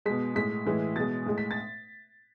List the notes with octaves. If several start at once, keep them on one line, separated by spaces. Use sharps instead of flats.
B2 G#3 B6
A2 G#3 B6
A2 E3 G#3
B2 G#3 A6
A2 G#3
B6
A6